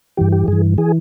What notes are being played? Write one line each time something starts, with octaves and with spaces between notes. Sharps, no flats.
G2 E3 G4
G4
G2 E3 G#4
E3 G#4